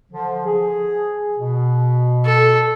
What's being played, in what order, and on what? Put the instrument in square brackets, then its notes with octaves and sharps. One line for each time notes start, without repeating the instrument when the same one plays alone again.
[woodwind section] D3 F3
G#4
B2
[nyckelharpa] A4